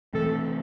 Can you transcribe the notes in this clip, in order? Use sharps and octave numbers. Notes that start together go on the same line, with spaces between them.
C3 E3 A3 C4 A4